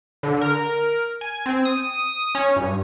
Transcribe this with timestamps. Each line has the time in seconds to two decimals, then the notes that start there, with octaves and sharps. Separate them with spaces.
0.23 D3
0.41 A#4
1.21 G#5
1.46 C4
1.65 D#6
2.35 C#4
2.56 G2